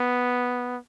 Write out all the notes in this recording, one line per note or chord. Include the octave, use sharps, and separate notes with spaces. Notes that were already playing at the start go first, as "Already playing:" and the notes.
Already playing: B3